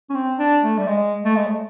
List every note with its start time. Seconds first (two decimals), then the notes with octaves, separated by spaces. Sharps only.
0.09 C#4
0.15 C4
0.39 D4
0.63 A3
0.78 G3
0.88 G#3
1.25 A3
1.36 G#3
1.47 A3